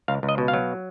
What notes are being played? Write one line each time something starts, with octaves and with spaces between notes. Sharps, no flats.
C#2 F5
C#2
D#5
B2
F5
F#3